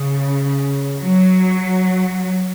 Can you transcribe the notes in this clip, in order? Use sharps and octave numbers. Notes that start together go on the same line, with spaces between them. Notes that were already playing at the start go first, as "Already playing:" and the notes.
Already playing: C#3
F#3